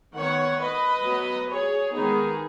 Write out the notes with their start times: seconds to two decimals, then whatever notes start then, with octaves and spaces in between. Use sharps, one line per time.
0.15 D#3 B3 C#5 F#5
0.60 B4 D#5
1.05 F#3 B3
1.49 G#4 C#5
1.92 D#3 G#3 B3 D#4 G#4